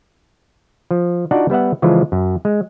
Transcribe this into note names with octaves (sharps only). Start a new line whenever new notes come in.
F3
D4 D#4 F4 F#4 D5 F#5
G3 B3 E5 F#5
C#3 E3 F3 G#3 F4 A4
F#2
G#3